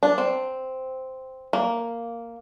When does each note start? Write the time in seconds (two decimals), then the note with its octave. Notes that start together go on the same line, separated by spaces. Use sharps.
0.03 D4
0.18 C4
1.53 A#3